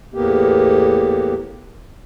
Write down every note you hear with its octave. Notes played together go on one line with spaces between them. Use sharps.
E2 A2 A#3 B3 G4